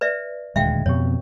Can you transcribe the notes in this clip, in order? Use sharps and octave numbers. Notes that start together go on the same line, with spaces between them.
B4 D5 E5
D#1 D2 G#3 E5 F5 G5
F2 B2 G4 C#5